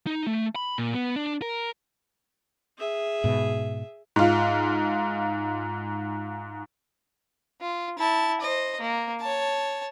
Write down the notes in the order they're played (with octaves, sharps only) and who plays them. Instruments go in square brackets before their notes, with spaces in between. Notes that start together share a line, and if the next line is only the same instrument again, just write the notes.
[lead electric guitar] D#4
A3
B5
A#2
B3
D4
A#4
[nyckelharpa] G#4 E5
[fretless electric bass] G#2 B2
[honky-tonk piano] G#2 F4
[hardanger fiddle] F4
E4 A5
C5 D#5
A#3
C#5 A5